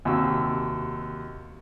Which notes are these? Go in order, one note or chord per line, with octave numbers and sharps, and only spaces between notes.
D#2 C3 F#4 E6